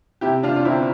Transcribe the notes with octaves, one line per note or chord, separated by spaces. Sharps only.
C3 E4 G4
C3 D4 F4
F4
G1 C4 E4